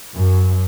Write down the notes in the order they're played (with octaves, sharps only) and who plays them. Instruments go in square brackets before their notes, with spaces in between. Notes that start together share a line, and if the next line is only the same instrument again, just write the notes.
[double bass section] F#2